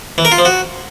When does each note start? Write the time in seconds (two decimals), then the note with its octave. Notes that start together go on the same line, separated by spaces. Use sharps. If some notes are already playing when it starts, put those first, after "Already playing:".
0.18 E3
0.25 A#4
0.32 F4
0.38 F3
0.45 F#4